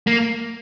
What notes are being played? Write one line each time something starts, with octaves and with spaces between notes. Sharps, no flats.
A#3